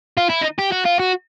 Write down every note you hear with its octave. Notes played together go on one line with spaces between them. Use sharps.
F4
E4
D#4
G4
F#4
F4
F#4